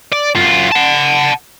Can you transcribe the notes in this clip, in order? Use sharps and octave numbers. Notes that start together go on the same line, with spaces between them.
D5
F#2 F4
F#5 A5